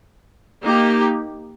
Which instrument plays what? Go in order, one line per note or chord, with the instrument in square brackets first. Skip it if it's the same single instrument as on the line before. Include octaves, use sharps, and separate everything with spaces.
[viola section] A#3 D#4 G4